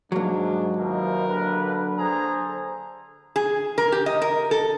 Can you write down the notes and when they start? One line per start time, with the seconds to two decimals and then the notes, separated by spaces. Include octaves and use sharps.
0.12 G#2 F#3 A#3 D4
0.77 D#2 B2 E3 F3 A#4
1.28 G2 D3 B4
1.97 G#4 A4 C5 A#5
3.36 G#4
3.78 A#4
3.92 G4
4.06 D#5
4.22 A#4
4.51 A4